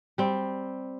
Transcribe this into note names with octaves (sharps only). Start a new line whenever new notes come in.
G3 C4